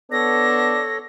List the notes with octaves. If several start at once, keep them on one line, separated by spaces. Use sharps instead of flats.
B3 D4 A4 C#5 A#6